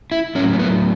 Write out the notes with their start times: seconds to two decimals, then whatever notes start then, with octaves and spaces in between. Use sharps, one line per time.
0.12 E4
0.35 A2 F#3 C#4
0.53 C#4
0.59 B3